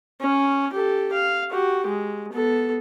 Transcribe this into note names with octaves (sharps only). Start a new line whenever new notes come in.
C#4
G4 A4
F5
F#4 G4
G#3
B3 A4